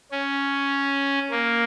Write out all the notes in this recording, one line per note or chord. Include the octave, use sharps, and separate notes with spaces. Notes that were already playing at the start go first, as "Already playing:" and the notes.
C#4
A#3